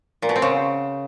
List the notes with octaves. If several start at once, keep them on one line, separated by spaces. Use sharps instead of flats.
A#2
B2
C4
C#3